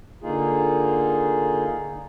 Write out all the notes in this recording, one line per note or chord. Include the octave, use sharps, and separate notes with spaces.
D3 A#3 D#4 F4 G#4